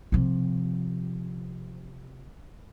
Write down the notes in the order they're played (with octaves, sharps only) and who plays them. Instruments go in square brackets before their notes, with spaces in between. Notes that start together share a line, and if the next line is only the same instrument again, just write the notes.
[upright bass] C3 F3